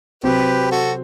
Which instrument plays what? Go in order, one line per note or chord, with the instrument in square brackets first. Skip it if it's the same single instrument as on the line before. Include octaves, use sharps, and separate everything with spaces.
[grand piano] C3 F#3 C4 [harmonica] G4 B4
[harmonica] F#4 A4